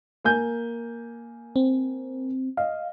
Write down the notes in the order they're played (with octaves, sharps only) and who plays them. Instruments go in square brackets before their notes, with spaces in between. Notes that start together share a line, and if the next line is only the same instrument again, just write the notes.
[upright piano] A#3 G#5 G6
[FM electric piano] C4
[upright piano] D#5 [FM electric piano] F5